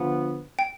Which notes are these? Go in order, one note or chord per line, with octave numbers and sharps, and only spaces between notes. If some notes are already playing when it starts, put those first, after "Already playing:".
Already playing: D3 F3 B3
G5